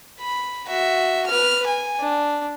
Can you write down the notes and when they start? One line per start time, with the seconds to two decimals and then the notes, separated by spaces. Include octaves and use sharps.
0.20 B5
0.67 F#4 E5
1.26 B4 F6
1.67 G#5
2.00 D4